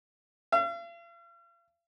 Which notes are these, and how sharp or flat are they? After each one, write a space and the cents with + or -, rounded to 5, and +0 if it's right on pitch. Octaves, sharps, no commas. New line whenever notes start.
F5 -45